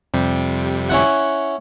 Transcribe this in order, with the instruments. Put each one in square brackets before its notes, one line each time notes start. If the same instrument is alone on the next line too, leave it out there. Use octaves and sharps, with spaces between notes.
[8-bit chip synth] F2 C3 G3
[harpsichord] C#4 E4 F#5